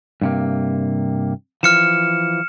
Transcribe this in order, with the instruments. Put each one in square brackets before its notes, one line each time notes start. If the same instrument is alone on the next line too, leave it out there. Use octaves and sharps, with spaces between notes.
[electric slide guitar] G2 C3 A#3
[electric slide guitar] E3 F3 [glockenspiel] F6 C#7 E7